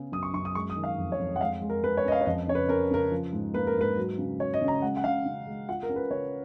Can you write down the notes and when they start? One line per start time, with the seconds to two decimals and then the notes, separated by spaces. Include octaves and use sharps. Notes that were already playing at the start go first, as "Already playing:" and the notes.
Already playing: C#3 B3 C#4
0.12 F#2 D#6
0.23 C#6
0.34 F#2 C#6
0.45 D#6
0.55 G#3 C#6
0.70 D#6
0.76 D#3
0.84 F5
0.98 F2
1.12 C#5
1.19 F2
1.36 F#5
1.41 G#3 F5
1.62 G#3
1.69 A#4
1.83 G#3 B4
1.97 C#5
2.05 C#4 D#5
2.12 F5
2.21 C#5
2.26 F2 D#5
2.48 C#3 C#5
2.55 B4
2.68 C#4 A#4
2.91 C#3 A#4
3.11 F3
3.33 G#2
3.54 A#3 B4
3.67 A#4
3.76 G#2 B4
3.97 F#3
4.18 C#3
4.40 F#3 C#5
4.54 D#5
4.61 C#3
4.68 A#5
4.82 G#3 F#5
4.97 F#5
5.04 C#3 F5
5.26 C#3
5.47 G#3
5.69 F4 F#5
5.83 A#4
5.89 C#4
5.96 B4
6.10 C#3 C#5